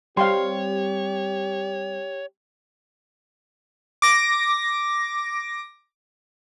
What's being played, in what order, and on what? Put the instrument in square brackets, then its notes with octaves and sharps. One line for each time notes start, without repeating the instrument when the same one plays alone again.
[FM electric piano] G3 C4 [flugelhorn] G4 [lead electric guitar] C#5 [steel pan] F5 G5 C6
[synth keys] D6 A#6